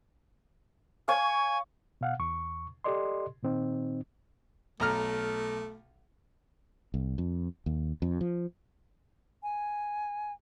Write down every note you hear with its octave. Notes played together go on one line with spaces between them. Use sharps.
C#5 F5 G#5
B2 F5 F#5
E2 C#6
G4 A4 D5 D#5 C6
A#2 D#3 C4 D#4
B1 A3 A#5 F6
C2
F2
D#2
F2
F3
G#5